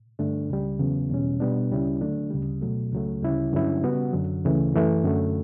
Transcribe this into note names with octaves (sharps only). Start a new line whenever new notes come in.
G2 D3 A3 D4
C#2 C#3 G3
E2 C#3 F#3 B3
E2 B2 G3 C#4
B2 G3 B3 D4
D2 C#3 G3 C#4 E4
D3 F#3 A3 D4
D2 C#3 G3
B2 F#3 A3
C#2 C#3 F#3 A3
D2 C#3 G3 C#4 E4
G2 D3 F#3 C#4 E4
C#3 G3 B3 F#4
F#2 D3 F#3
D2 C#3 E3 A3
F#2 E3 A3
F#2 D3 F#3 A3